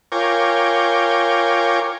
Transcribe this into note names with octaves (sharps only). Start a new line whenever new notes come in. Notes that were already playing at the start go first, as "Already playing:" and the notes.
F4 A#4 C#5 G5 G#5 D6